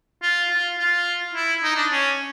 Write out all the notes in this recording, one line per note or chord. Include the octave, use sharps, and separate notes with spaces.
F4
F4
F4
E4
D#4
D4
C#4